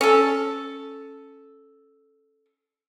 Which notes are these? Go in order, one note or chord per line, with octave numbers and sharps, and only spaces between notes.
C#4 A4